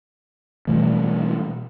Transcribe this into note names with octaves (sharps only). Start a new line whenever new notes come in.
B2 E3 G3 A3